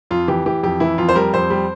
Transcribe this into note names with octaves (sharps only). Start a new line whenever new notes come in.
F2 F4
E3 G4
E3 G4
F2 G4
E3 E4
F2 F4
C5
G3 A#4
F2 C5
G3